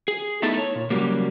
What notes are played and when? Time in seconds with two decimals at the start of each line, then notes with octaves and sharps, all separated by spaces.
0.08 G#4
0.42 A3 B3 D#4 E4 A4 A5
0.58 C#5
0.75 A#2
0.90 C#3 F#3 G3 A#3